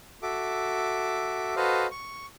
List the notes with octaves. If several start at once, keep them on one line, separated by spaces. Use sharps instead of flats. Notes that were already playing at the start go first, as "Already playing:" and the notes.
F#4 A4 E5 D6
F#4 A4 B4 C5 D#5 F5
C#6